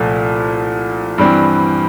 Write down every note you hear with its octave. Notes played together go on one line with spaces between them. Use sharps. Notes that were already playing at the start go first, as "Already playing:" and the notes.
Already playing: C2 A#2 F3 A3
G2 E3 G3 C4